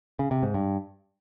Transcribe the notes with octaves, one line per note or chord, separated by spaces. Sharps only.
C#3
C3
G#2
G2